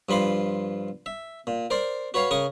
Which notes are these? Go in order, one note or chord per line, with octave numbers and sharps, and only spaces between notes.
G2 F3 B5 C6 D6
E5
A#2
A#4 C5 D5
F#4 B4 C#5 F5
C#3 A#4 C#6 D#6